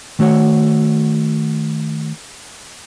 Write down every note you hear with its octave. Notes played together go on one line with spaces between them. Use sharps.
D#3 A3 F#4 C#5 F#5